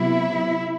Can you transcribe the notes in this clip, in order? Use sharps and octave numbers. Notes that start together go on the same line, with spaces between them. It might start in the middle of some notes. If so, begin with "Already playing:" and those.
Already playing: C3 F#3 B3 E4